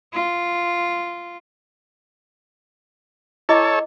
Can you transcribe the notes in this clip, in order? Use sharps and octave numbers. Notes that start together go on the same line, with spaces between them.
F4
E4 A4 C#5 D#5 D6